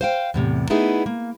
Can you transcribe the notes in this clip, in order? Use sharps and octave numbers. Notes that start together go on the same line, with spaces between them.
C5 F5 G5
E2 A2 C3
A3 B3 D#4 E4 G#4
A#3